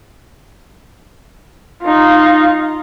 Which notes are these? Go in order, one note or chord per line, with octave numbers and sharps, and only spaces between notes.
D#4 F4